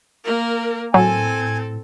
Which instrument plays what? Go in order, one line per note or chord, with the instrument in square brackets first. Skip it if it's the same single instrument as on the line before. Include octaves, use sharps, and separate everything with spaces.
[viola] A#3 A#4
[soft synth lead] A2 [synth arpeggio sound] F#3 [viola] C4 A4 [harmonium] G#5